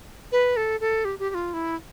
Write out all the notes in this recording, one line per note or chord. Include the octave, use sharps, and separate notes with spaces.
B4
A4
A4
G4
G4
G4
F4
E4